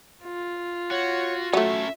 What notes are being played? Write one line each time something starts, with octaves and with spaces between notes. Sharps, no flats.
F4
F#4 C#5
F#3 A3 C#4 A4 C#5 E5